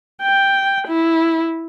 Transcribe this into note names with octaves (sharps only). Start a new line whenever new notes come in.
G5
E4